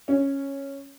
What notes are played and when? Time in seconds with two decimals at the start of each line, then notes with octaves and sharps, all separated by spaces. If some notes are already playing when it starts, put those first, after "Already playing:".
0.08 C#4